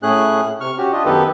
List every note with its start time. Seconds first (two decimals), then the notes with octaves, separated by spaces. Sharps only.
0.03 A2 A3 C#4 G#4 F#6
0.61 C3 C#6 F6
0.78 C#4 F#4 G4
0.93 D4 F4 D#5
1.05 F#2 D#3 B3 G4 A4 B4